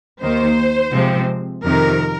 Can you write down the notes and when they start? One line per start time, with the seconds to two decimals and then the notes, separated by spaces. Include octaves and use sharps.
0.20 D#2 D#3 A#3 C5
0.92 C3 F3 G#3 C4
1.64 F2 C3 D#3 A#4